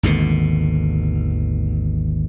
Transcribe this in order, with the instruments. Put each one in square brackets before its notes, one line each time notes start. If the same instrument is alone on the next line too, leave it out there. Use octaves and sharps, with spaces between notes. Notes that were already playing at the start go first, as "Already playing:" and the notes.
[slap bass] G#1 D#2 B2 D3